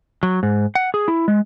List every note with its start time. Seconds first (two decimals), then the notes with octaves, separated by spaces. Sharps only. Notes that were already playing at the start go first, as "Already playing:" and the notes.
0.23 F#3
0.43 G#2
0.75 F#5
0.94 G#4
1.08 E4
1.28 G#3